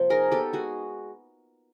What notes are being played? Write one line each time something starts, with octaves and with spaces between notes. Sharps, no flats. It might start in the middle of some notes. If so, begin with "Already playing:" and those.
Already playing: C3 F3 A#3 C5
D#4 G#4 A#4
B3 G4 A4
G#3 F#4 G#4